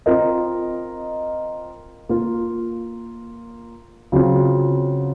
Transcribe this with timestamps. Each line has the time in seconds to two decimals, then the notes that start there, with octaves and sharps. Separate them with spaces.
0.06 C4 F4 A#4 D#5
2.09 A#3 F4 A#4
4.12 C#3 F#3 C4 F4